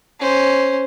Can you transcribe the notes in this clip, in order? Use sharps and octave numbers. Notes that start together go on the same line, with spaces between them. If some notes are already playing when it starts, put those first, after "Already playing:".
C#4 C5